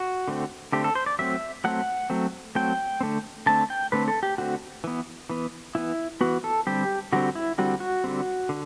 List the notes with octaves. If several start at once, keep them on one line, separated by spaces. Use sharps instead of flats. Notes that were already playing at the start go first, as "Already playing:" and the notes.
Already playing: F#4
D3 A3 C4
D3 A3 C4 G4
A4
C5
D5
F#3 A3 C4 E5
F#3 A3 C4 F#5
F#3 A3 C4
F#3 A3 C4 G5
C4
D3 A3
D3 A3 C4 A5
G5
D3 A3 C4 B4
A4
G4
D3 A3 C4 F#4
E3 B3
E3 B3
E3 B3 E4
E3 B3 F#4
A4
D3 G3 C4 G4
D3 G3 C4 F#4
E4
D3 G3 C4 F#4
F#4
D3 G3 C4
D3